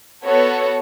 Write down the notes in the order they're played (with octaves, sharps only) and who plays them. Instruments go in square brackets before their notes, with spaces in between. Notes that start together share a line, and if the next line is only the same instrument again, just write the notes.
[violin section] B3 F#4 A4 C#5